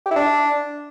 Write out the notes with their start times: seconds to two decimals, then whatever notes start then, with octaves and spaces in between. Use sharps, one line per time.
0.06 G4
0.11 E4
0.16 D4